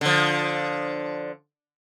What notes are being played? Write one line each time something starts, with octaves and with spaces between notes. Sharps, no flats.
D3 F3